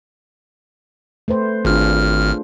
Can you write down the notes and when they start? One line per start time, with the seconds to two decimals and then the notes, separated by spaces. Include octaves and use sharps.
1.28 A3 B4 C5
1.65 G#1 D4 F4 G#4 F6